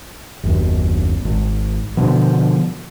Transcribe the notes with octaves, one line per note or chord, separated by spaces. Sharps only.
F#1 D#2
G#1
B2 D3 F3